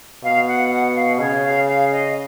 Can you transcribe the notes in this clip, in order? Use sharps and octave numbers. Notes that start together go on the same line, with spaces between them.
B2 F5
F#5
F#5
F5
C#3 C#5
F5
F5
D#5